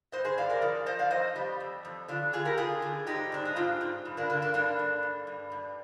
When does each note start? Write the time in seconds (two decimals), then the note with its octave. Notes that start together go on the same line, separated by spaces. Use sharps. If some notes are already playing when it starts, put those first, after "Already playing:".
0.12 G2 C5 D#5
0.25 G#4 C5
0.38 G2 D5 F5
0.49 A#4 D5
0.61 F3 A#4 D5
0.86 F3 C5 D#5
0.99 D5 F5
1.11 F2 C5 D#5
1.36 G3
1.60 F2
1.85 F2
2.08 D3 D4 F4
2.33 D3 F4 G#4
2.45 G4 A#4
2.57 D3 F4 G#4
2.82 D3
3.07 G#2 D#4 G4
3.32 G#2 D4
3.45 D#4
3.56 G#2 D4 F4
3.81 G#2
4.05 G2
4.17 A#3 D4
4.30 D3 A#3
4.42 A#3 D4
4.54 G2 A#3 D4
4.79 G2
5.03 G2
5.27 G2
5.52 G2